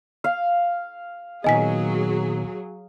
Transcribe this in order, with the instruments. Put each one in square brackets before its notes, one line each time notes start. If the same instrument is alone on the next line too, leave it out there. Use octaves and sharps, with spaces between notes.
[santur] F5
[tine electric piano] A#2 D#3 B3 [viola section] F#3 G#4 [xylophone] D#5 G#5 B6